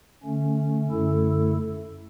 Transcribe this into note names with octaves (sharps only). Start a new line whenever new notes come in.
D3 A3 C#4
F#2 D3 A3 E4 A4